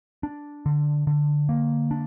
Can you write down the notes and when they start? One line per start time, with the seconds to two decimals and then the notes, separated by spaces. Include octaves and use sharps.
0.23 D4
0.66 D3
1.07 D3
1.49 A#3
1.91 D4